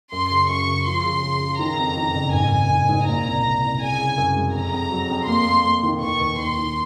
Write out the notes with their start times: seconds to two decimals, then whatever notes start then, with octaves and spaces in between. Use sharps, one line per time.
0.12 F#2 C6
0.31 C#3
0.49 F#2 C#6
0.68 C#3
0.86 F3 C6
1.04 C#3
1.23 C#3
1.41 C#3
1.59 D#3 A#5
1.79 F2
1.97 D#3
2.14 F#1
2.33 G#1 G#5
2.51 G#1
2.70 G#1
2.89 G#2
3.07 A#2 A#5
3.25 C2
3.44 C2
3.63 C2
3.80 C#3 G#5
3.98 C#3
4.17 F#2
4.35 G#3
4.54 F2 A#5
4.73 F2
4.91 F#3
5.10 F2
5.27 A#3 C6
5.46 A#3
5.65 A#3
5.83 D#3
6.02 D#2 C#6
6.21 D#2
6.39 D#2 C6
6.57 D#3